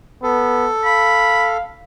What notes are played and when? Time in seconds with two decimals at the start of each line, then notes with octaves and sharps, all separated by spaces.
0.23 B3 A4
0.85 F5 B5